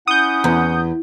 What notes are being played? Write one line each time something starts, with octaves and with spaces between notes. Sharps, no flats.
C#4 E4 F#5 D#6 G6
E2